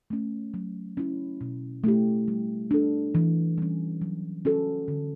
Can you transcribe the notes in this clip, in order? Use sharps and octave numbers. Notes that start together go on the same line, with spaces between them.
A3 C#4
F#3
C#4 E4
B2
A3 E4 G4
G3
D4 A4
E3
G3 C#4
F#3
C#4 F#4 A4
D3